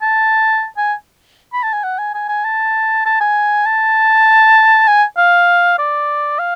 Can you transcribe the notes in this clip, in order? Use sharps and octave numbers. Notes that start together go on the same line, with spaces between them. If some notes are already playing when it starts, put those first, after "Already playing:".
A5
G#5
B5
A5
G#5
F#5
G#5
G#5
G#5
A5
A5
G#5
A5
G#5
F5
D5
F5